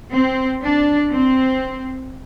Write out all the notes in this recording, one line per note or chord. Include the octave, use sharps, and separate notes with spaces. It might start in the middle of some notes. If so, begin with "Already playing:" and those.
C4
D4
C4